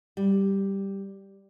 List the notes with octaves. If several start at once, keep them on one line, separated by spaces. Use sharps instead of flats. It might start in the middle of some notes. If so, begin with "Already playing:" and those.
G3